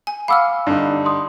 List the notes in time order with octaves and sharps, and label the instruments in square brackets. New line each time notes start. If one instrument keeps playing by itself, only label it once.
[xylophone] G#5
[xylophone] F5 F#5 F6 [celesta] B5 D6 E6
[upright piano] G2 D3 D#4
[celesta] C6 D#6